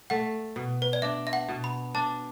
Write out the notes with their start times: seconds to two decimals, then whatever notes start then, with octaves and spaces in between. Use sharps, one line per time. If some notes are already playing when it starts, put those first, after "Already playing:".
0.10 A3 F#5
0.56 B2
0.82 B4
0.93 D5
1.02 D4 E5
1.27 E5
1.33 F#5
1.49 B2
1.64 B5
1.94 D4 A5